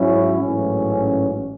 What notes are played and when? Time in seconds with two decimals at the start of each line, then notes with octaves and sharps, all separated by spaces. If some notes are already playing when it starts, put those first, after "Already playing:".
Already playing: G#2 F#3 C#4 E4
0.39 A1 G#2 F#3 C#4